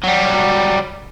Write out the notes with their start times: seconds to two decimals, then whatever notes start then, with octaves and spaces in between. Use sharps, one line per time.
0.03 F#3 G3